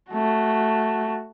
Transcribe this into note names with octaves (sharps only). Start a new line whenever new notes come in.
A3 F#4